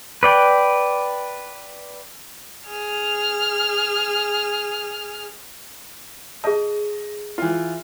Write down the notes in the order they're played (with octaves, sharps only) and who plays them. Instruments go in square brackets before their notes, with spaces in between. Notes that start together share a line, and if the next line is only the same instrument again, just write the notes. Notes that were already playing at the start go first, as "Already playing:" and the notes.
[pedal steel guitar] B4 D5 G5
[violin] G#4 F6
[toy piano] G#4 A5 [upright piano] D#5
[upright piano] E3 F4